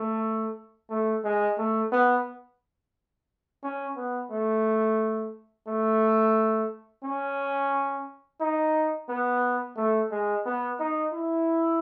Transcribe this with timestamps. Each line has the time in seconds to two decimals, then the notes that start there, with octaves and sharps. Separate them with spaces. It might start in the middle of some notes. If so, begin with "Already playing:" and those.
Already playing: A3
0.90 A3
1.24 G#3
1.58 A3
1.92 B3
3.63 C#4
3.97 B3
4.31 A3
5.68 A3
7.04 C#4
8.41 D#4
9.09 B3
9.77 A3
10.11 G#3
10.46 B3
10.80 D#4
11.13 E4